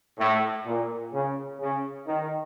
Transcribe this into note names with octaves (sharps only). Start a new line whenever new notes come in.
A2
A#2
C#3
C#3
D#3